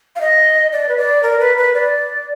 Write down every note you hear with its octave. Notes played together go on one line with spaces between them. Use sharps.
F5
D#5
D5
B4
D5
A#4
B4
B4
D5